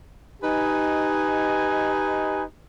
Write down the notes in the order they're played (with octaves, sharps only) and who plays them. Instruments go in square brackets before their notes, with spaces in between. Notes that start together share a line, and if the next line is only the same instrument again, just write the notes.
[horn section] D#4 G4 B4 D#5 G#5